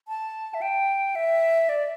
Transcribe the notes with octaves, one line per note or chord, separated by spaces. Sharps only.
A5
E5
G5
E5
D5